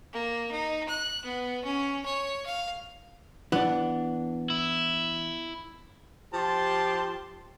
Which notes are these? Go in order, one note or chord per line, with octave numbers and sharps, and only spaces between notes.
A#3
D#4
F#6
B3
C#4
C#5
F5
E3 B3 D4
E4
F3 G4 A5 C6